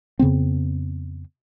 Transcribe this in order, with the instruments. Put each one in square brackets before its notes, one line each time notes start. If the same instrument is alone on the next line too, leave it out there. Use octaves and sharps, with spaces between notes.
[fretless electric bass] F2 C#3 B3 C4